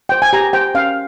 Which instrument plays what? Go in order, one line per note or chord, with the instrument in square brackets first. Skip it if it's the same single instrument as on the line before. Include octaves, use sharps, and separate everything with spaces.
[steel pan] C5 G5
G#5
G4 A#5
C5 G5
C#4 F5